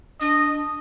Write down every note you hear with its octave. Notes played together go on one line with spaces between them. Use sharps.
D4 D#5